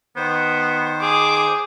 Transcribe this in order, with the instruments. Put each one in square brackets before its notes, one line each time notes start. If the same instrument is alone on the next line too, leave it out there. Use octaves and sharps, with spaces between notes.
[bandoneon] D#3 C5 [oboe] B3
[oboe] G#4 [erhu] D6